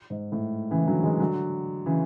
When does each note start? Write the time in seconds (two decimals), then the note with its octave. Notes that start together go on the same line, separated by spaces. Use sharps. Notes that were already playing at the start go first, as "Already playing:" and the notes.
0.10 G#2
0.32 A2
0.71 C#3 E3
0.87 D3 F#3
1.03 E3 G#3
1.20 D3 F#3
1.86 C#3 E3